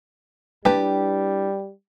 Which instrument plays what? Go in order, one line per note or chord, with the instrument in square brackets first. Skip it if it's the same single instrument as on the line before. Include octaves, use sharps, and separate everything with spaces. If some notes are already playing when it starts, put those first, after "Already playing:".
[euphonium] G3 [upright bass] D4 E4 [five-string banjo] G4 B4 A5